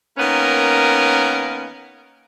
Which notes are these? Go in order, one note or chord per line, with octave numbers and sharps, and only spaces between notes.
D#3 A#3 B3 C#4 A#4